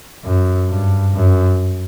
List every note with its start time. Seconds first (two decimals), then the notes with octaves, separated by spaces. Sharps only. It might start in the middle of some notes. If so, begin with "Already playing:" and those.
0.25 F#2
0.69 G2
1.14 F#2